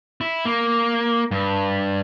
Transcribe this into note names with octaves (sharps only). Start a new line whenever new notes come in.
E4
A#3
G2